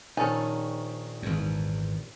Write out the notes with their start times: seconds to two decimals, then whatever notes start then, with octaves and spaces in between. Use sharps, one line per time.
0.17 A#1 D#3 C#4 D#4 A4 F#5
1.22 G#1 E2